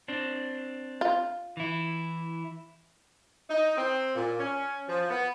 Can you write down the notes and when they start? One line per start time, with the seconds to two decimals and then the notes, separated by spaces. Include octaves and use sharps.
0.08 C4 D4
1.01 F4
1.57 E3 E4
3.50 D#4
3.77 C4
4.15 A#2
4.39 C#4
4.88 F3
5.11 B3